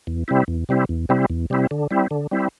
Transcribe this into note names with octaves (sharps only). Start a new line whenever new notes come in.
E2
C3 G3 C4 E4
E2
C3 G3 C4 E4
E2
C3 G3 C4 E4
E2
C3 G3 C4 E4
D3
G3 C4 E4
D3
G3 C4 E4